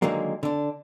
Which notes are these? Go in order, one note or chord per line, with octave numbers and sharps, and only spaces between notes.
D3 D#3 F#3 G#3 A#3
D3 D4